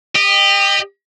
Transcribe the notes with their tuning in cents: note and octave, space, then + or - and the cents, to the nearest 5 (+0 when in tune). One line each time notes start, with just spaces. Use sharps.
G4 +15 D#5 -20